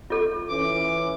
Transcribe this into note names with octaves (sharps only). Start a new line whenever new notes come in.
F4 A4
E3 C#4 D6